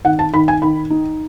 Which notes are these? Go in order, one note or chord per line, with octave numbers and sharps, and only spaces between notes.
D#3 F#5
A5
D#3 B5
G#5
D#3 B5
D#4